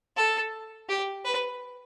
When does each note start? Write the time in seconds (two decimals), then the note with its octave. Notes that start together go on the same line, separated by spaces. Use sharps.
0.16 A4
0.89 G4
1.25 B4